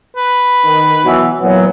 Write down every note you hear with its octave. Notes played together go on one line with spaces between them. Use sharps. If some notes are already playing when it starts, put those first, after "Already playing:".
B4
D#3
B2 E3 F#3
A#2 E3 F#3 B3